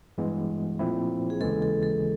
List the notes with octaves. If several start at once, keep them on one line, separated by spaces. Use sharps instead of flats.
G2 E3 G#3 B3
A#2 F3 A3 C4 E4
G#4
D#2 C#3 E3 G#3 A4
A4
A4